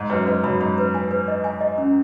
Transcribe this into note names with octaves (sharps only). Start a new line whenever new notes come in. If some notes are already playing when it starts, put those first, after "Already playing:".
Already playing: G#2
F#2 B4
G#2 B4
F#2 B5
G#2 B5
B4
G#5
B4
D#5
G#5
D#5
C#4